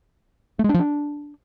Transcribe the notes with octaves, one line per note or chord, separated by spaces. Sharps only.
A3
G#3
D4
F3
D4